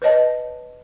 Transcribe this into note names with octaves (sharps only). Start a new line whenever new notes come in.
B4 C#5 D#5 A5